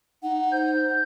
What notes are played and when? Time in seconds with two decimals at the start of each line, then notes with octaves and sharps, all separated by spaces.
0.23 D#4 F#5
0.52 C5 G6